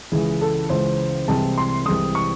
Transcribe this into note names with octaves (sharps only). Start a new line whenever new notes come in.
C#2 C#3 E3 G#4
A4
C#2 C#3 E3 C5
C2 C3 E3 G#3 C4 A5
C6
C2 C3 E3 G#3 C4 D#6
C#6